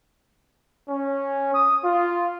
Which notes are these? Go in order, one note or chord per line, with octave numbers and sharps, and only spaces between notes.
C#4
D#6
F4